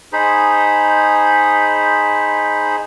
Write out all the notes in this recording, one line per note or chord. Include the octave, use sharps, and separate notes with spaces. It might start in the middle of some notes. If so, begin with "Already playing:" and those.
D#4 G#4 C5 B5